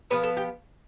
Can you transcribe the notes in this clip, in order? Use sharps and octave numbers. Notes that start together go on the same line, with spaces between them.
F3 G#3 B3 B4
A4
G4